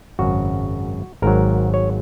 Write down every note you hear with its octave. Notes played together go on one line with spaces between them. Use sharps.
G#1 F#2 C#3 F#4
G#1 G#2 F#3 A#4
C#5